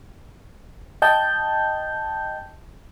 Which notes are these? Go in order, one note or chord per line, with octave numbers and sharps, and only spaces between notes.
D#5 G5 A5 G6